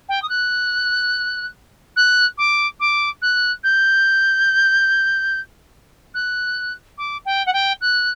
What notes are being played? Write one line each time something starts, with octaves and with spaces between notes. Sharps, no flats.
G5
D#6
F#6
F#6
D6
D6
F#6
G6
F#6
D6
G5
F#5
G5
F#6